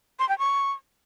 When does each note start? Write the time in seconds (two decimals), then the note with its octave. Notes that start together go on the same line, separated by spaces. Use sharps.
0.19 C6
0.29 G5
0.39 C#6